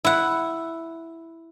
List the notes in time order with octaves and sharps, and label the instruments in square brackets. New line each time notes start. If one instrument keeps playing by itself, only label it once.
[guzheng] E4 F#5